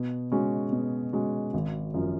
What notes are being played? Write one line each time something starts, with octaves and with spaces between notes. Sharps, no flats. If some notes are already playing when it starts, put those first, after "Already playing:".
Already playing: B2
G#3 C#4 F#4
B2
G#3 C#4 F#4
G#1
F#2 F3